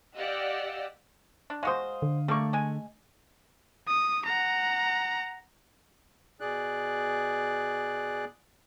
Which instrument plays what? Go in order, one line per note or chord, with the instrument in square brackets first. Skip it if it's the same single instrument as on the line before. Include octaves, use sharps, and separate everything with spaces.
[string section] G4 D5 D#5 F5 F#5 E6
[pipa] D4
[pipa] G#3 F#4 C5 [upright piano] F5 D#6
[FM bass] D3
[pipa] G3 A#3 C#6 [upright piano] A3
[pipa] G#3 G#5
[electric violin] D#6
F#5 A#5
[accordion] B2 G#4 D5 F#6